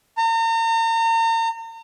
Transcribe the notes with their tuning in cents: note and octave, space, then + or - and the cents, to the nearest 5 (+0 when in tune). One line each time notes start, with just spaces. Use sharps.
A#5 -40